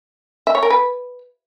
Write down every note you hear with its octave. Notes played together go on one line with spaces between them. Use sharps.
E5
C#5
A#4
B4